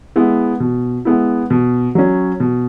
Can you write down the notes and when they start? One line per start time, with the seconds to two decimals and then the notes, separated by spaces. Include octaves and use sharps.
0.16 G#3 B3 E4
0.60 B2
1.05 G#3 B3 E4
1.50 B2
1.95 F#3 C#4
2.40 B2